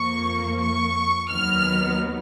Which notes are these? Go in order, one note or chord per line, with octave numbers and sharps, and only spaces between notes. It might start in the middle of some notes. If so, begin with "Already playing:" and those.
Already playing: F2 F3 A#3 C#6
C#6
D#2 D#3 F#3 B3 F6